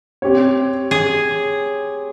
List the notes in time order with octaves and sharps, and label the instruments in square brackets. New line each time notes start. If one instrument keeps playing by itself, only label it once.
[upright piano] C4 G4 C#5
[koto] G#4